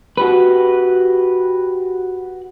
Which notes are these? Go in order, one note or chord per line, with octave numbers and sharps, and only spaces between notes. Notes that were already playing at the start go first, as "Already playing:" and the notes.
F#4 G4 B4